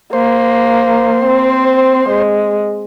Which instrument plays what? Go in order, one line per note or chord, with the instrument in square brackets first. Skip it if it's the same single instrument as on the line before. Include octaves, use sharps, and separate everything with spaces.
[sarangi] A#3 [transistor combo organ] C5
[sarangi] C4
G#3